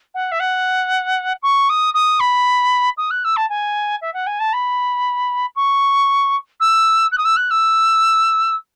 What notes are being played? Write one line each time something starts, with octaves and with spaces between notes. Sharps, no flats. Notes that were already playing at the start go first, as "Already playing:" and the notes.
F#5
E5
F#5
C#6
D#6
D#6
B5
D#6
F#6
E6
A5
G#5
E5
F#5
G#5
A5
B5
C#6
E6
F#6
D#6
E6
F#6
E6